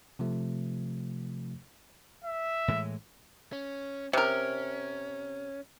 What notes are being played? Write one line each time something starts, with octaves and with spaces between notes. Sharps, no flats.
C3 F3 A3
E5
A2 E3 G#3
C#4
C3 C#4 A#4